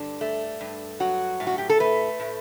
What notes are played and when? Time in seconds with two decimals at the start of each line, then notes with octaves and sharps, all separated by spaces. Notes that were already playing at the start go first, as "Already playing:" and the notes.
Already playing: G2 D3 D4
0.21 A3
0.61 G2
1.00 F#3 F#4
1.40 A2
1.47 F#4
1.58 G4
1.70 A4
1.80 A3 B4
2.20 A2